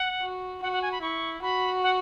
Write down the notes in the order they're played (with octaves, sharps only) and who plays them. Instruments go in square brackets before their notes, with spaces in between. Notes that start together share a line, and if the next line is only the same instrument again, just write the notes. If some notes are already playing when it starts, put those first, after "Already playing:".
Already playing: [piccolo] F#5
[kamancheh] F#4
[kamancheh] F#4 [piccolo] F#5
[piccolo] F#5
G#5
B5
[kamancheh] E4 [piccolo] C#6
[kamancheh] F#4 [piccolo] B5
[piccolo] F#5